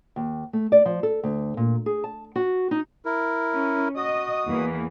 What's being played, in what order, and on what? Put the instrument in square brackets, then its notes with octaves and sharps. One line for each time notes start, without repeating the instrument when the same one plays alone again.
[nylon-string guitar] D#2
A3
D5
F3
A4
D2
A#2
G#4
A5
F#4
D#4
[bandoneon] E4 A#4
[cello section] C#4
[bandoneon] F#4 D#6 [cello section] D#5
[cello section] E2 E3 A#3